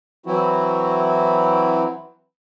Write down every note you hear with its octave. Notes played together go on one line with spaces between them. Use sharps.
E3 F#3 C4 E4 F#4